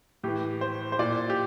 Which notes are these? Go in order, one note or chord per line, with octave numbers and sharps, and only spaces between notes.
A2 E3 G4
C5
C5
A#2 D5
G4